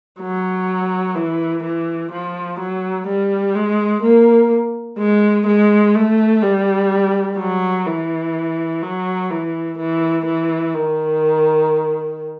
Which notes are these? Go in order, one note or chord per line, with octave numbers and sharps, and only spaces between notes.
F#3
E3
E3
F3
F#3
G3
G#3
A#3
G#3
G#3
A3
G3
F#3
E3
F#3
E3
E3
E3
D#3